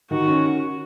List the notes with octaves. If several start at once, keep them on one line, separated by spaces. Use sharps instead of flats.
D#3 F#4
C#4